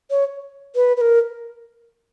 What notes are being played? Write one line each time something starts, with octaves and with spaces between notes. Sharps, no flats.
C#5
B4
B4
A#4